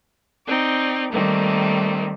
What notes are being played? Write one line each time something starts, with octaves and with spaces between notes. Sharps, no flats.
C4 D#4 D5
D#3 G3 A3 A#3 C4